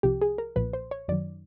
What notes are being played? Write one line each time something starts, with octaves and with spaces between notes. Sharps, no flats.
C2 C3 F3 G4
G#4
A#4
B1 A#2 F3 B4
C5
C#5
F#2 D#3 F#3 D5